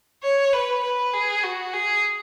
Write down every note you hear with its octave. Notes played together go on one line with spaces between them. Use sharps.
C#5
B4
B4
G#4
F#4
G#4